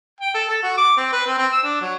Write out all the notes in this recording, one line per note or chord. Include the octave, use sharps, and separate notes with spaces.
G5
A4
A4
F#4
D6
C4
B4
C4
C4
E6
D4
F#3